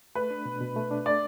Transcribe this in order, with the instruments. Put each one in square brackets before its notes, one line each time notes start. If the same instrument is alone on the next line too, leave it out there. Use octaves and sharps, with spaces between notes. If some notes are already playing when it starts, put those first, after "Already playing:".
[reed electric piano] A3 [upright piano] B4
[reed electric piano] D4
B2
B2
A3
D4
[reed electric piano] A3 [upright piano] D5